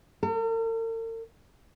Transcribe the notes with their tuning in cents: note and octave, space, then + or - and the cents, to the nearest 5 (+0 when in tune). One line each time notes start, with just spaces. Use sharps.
A#4 -45